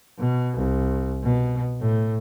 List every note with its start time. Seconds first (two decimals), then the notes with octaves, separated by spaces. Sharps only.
0.19 B2
0.57 C2
1.23 B2
1.81 A2